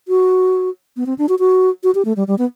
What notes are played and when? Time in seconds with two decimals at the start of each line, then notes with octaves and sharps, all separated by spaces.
0.08 F#4
0.97 B3
1.06 C4
1.18 D4
1.29 F#4
1.39 F#4
1.83 F#4
1.95 G4
2.05 A3
2.16 G3
2.27 G3
2.38 B3